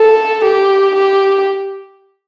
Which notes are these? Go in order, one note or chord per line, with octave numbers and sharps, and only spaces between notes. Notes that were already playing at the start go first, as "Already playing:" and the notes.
Already playing: A4
G4
G4